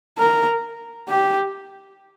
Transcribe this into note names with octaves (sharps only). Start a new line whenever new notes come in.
A#4
G4